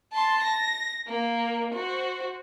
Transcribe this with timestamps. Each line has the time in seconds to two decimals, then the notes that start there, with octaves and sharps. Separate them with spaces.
0.13 A5 C6
0.43 A#6
1.07 A#3
1.74 F#4 C5